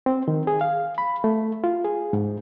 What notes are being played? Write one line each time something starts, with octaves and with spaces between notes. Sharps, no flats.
C4
D#3
G#4
F5
B5
A3
F4
G#4
G#2